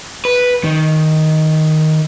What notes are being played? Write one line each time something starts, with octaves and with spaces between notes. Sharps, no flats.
B4
D#3